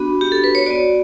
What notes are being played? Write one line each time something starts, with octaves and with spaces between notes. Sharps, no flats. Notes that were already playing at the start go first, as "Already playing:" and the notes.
Already playing: B3 D4 F#4 B5
G4
A4
B4
C#5
B3 F#4 D5